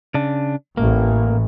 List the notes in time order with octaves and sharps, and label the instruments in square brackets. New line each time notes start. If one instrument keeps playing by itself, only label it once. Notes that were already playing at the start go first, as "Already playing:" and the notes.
[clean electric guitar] C#3 D4
[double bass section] A1 [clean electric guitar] A#3